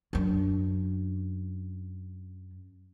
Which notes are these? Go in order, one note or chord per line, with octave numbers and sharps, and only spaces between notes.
F#2 D4